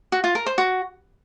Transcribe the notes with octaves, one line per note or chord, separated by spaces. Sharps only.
F#4
F4
A#4
C5
F#4